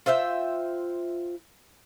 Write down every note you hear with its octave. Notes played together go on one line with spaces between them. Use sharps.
F4 C5 E5 G5